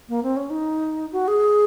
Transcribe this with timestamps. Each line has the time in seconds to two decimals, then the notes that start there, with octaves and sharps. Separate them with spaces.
0.09 A#3
0.23 C4
0.36 C#4
0.50 D#4
1.12 F#4
1.28 G#4